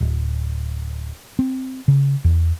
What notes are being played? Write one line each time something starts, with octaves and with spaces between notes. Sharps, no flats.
D1
C4
C#3
E2